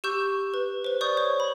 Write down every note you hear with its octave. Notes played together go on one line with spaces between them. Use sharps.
G4 C#6 E6 G6
B4
B4 C5
D5 C#6 D#6 G6
C#5
B5